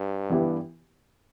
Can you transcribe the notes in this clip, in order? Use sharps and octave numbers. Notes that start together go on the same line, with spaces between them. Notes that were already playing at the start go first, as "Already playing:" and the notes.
Already playing: G2
E3 B3 E4 G4